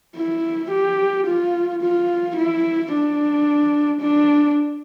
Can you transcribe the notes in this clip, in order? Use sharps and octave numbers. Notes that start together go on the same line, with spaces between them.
E4
G4
F4
F4
E4
D4
D4